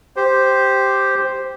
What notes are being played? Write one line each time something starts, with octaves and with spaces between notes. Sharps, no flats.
G4 C5